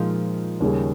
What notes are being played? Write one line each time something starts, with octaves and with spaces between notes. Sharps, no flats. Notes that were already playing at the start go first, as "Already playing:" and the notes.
Already playing: A#2 F3 G#3 D#4
D#2 C#3 G3 C#4 G#4